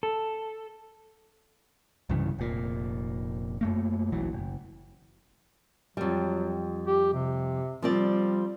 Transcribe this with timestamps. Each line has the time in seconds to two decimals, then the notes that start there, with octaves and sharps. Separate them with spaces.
0.03 A4
2.09 C2 G2 C#3 E3
2.39 F1 A#2
3.61 F#2 A3 A#3
4.12 E1 B1 E3 F#3
4.33 F#1
5.97 F2 F#3 G3
6.87 G4
7.13 C3
7.82 F3 G3 C4 D5